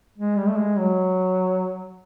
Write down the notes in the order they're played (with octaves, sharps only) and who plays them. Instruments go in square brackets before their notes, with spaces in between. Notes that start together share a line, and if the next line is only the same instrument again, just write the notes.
[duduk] G#3
G3
A3
G#3
F#3